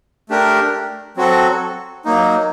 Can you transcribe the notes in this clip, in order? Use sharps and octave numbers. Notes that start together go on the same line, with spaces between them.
A3 D4 G4 A#4
F#3 C4 F#4 A4
F#3 A#3 D#4